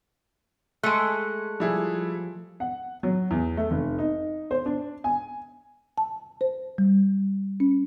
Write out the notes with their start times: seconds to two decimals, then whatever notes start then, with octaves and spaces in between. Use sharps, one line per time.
0.83 G#3 A3 F#6 C#7
1.60 F3 G3 E4 G#4
2.60 F#5
3.03 F#3
3.31 E2
3.57 A3
3.71 F1
3.98 D#4
4.51 C5
4.66 D4
5.04 G#5
5.98 A5
6.41 C5
6.78 G3
7.60 C#4